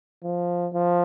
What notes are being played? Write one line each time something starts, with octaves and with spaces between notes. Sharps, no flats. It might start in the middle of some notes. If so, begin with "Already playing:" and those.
F3
F3